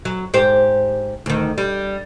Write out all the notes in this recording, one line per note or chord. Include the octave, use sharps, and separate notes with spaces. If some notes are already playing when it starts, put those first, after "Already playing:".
F#3
G#2 G4 C5
D2 D#3
G3